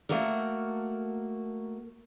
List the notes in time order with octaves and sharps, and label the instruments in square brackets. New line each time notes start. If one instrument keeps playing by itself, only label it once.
[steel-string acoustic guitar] A3 A#3 F#4 A4 A#4